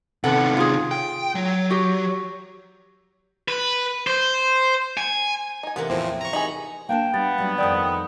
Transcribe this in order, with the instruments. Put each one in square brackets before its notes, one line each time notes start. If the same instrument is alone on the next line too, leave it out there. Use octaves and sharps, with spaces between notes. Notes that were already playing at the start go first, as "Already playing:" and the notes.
[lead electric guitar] C3 D#3 [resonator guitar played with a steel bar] B3 A4 F#5
[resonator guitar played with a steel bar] F4 G#4
[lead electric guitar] G5
F#3
[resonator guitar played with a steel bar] F#4 G4
[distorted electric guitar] B4
C5
G#5
[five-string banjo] D#4 G#5
[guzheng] C3 E3 A#3 [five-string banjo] B3
[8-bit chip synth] E2 A2 F3 [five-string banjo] C4
[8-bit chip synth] A#5 C#6
[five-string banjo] D#4 G#4 [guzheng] B5
[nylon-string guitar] A#3 D4 A5 [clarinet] G5
[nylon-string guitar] G3 [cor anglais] B3 [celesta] A6
[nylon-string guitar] F#3 G3 D4
[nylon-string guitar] F2 D#3 [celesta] D5 D#6 [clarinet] G5
[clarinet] G3